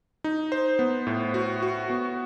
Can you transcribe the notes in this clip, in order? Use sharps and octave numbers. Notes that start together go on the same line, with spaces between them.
D#4
C5
B3
A2
F#4
F#4
B3